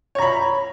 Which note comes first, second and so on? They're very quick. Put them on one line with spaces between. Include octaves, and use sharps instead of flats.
C#5 A#5 B5